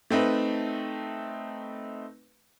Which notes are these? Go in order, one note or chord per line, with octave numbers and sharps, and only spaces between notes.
A3 C4 D#4 B4